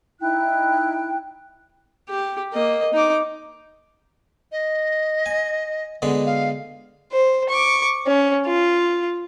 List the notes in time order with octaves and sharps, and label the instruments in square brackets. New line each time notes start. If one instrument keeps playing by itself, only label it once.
[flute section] D#4 E4 G5 F#6
[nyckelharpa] G4
A#3 D#5
D#4 D6
[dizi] D#5
[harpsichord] G#5
B2 D3 G#3
[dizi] F5
[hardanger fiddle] C5
C#6 D6
C#4
F4